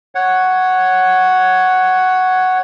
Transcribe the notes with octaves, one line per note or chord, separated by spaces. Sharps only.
C#5 F#5